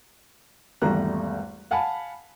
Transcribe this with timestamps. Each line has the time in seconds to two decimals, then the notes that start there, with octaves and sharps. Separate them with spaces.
0.82 G#1 E2 G3 A3 A#5 F#6
1.71 F5 F#5 G#5 A5 B5